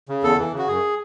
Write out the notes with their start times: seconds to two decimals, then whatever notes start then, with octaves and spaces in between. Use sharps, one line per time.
0.09 C#3
0.23 E2 A4
0.39 E3
0.53 C#3
0.58 F#4
0.68 F#2 G#4